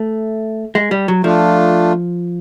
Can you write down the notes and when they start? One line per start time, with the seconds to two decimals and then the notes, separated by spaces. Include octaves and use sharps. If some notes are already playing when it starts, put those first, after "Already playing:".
Already playing: A3
0.75 G#3
0.91 G3
1.08 F#3
1.24 F3 A3 D4 F4